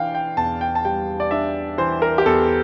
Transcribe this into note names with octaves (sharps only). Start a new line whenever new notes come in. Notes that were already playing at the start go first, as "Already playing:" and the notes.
Already playing: E3 D4 F5 G5
G5
E2 A5
G5
A5
G3 G5
D5
D4 E5
E3 C5
A#4
G4
E2 A4